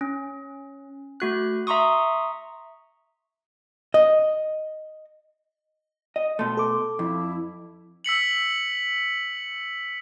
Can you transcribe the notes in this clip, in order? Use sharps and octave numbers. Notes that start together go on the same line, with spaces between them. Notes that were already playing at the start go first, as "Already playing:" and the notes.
C#4
A3 F#4 F#6
E5 A#5 C6 C#6 D#6
D#5
D#5
B2 A3 C6
A4 D6
F2 E4
E6 B6 C#7 F#7